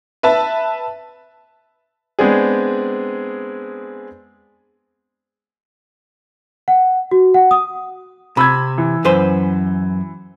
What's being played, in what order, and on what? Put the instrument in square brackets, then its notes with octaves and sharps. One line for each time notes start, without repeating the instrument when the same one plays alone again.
[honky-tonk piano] B4 E5 A5
[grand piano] G#3 B3 C4 D4 G#4
[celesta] F#5
F#4
F#5
D#6
[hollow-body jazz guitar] C3 [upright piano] B5 E6 G#6
[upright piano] E3
[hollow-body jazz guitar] F#2 B4 C5